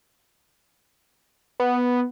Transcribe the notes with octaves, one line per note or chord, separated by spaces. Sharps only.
B3